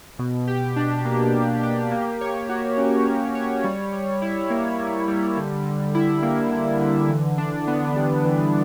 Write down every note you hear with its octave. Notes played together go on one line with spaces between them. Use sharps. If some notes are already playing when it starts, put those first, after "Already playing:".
B2
G4
D4
A#3
B2
G4
A#3
C#5
F#4
C#4
A#3
C#5
G3
G3
E4
A#3
G3
G3
D3
D3
E4
A#3
D3
D3
E3
D4
B3
G3
E3